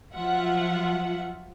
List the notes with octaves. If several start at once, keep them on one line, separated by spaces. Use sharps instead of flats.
F3 F#3 F4 E5 F#5